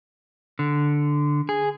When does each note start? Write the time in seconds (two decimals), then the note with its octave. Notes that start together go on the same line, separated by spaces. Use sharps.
0.59 D3
1.49 G#4